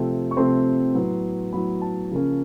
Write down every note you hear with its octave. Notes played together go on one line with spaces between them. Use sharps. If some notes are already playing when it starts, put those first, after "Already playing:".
Already playing: C3 F3 A3 C4
C#6
C3 F3 A3 C4 C6
A2 F#3 B3
A2 F#3 B3 B5
A5
C#3 F3 A#3 C#4